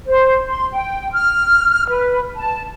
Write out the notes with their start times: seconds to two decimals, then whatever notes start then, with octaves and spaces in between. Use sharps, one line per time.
0.07 C5
0.48 C6
0.72 G5
1.12 F6
1.88 B4
2.36 A5